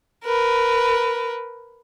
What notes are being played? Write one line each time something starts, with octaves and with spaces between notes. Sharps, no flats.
A#4 B4